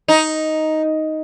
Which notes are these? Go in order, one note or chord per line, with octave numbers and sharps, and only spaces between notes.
D#4